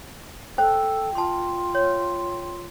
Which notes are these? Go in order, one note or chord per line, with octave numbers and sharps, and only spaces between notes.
A4 C5 G5
F4 A5 C6
C#5